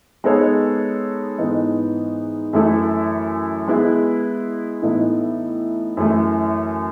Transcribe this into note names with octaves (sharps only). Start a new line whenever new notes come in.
G#3 B3 D#4 A4 C#5
G#2 E3 B3 D#4
F#2 E3 A3 E4 A4
G#3 B3 E4
A2 E3 B3 D#4 A4
F#2 E3 A3